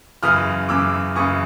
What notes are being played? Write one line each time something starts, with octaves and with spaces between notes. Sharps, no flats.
F#2 C#3 E3 D#6 F6
F#2 C#3 E3 D6 E6
F#2 C#3 E3 C#6 D#6